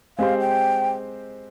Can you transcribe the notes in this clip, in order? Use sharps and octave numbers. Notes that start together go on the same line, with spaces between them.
G#3 C4 G4 C5 F5
G5